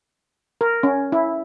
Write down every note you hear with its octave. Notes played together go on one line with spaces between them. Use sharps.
A#4
C#4
E4